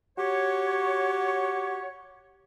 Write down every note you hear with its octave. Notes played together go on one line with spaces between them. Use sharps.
F#4 G4 C#5